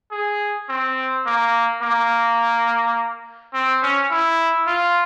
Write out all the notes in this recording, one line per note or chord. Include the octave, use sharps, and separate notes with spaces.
G#4
C4
A#3
A#3
C4
C#4
E4
F4